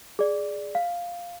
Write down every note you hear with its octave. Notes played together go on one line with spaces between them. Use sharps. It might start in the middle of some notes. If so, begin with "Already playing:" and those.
G#4 D5
F5